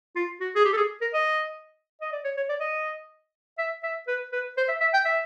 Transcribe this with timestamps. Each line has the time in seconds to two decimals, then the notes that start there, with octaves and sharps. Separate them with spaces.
0.16 F4
0.41 F#4
0.56 G#4
0.65 G4
0.73 A4
0.77 G#4
1.01 A#4
1.14 D#5
2.01 D#5
2.12 D5
2.24 C#5
2.37 C#5
2.49 D5
2.60 D#5
3.58 E5
3.83 E5
4.08 B4
4.32 B4
4.57 C5
4.68 E5
4.81 E5
4.94 G5
5.05 E5